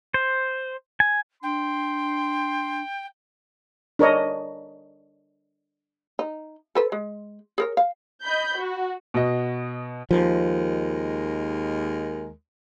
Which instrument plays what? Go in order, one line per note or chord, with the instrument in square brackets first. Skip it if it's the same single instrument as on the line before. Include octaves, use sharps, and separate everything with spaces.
[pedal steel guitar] C5
G#5
[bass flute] D4 [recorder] G5 [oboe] C6
[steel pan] D4 A#4 C#5 D#5
[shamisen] D#4
A4 B4 C5
G#3
G#4 A#4 C#5
F5
[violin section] D#5 B5 G6
F#4
[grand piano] B2 F#4 D#5
[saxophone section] D#2 G#3 A#4 [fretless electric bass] F3